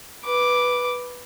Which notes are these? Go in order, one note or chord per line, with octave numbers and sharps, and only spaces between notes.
B4 D6